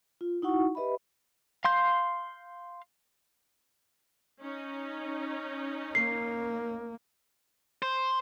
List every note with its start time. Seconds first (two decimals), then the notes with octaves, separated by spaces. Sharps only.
0.21 F4
0.42 D#4 E4 F#4 F#5 C#6
0.75 G4 B4 D#5 E5 B5
1.65 F5 C6 G6
4.41 C#4 D#4
5.95 A#3 C7
7.82 C5